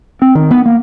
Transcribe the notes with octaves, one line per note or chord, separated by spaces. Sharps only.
C4
D#3
B3
A#3